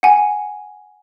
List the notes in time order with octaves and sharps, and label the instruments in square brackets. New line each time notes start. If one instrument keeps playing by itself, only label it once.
[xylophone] F#5 G#5